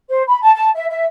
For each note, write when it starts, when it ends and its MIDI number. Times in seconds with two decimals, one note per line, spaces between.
0.09 0.21 72
0.26 0.40 83
0.41 0.52 81
0.53 0.68 81
0.74 0.84 76
0.89 1.04 76